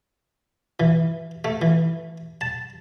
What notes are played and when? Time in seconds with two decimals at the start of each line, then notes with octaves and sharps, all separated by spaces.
0.80 E3
1.45 A3
1.62 E3
2.41 A5